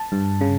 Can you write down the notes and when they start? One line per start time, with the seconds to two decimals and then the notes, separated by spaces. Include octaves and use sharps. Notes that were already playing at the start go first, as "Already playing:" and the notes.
Already playing: A5
0.12 G2
0.41 C#3